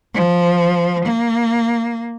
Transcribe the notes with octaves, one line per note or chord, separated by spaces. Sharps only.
F3
A#3